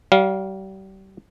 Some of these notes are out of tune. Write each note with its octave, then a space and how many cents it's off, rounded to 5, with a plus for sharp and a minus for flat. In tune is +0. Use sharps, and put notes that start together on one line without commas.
G3 -35 F5 +0